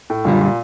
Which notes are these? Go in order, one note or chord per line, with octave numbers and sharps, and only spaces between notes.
A2
F#2 A#2 D3 G3
A#2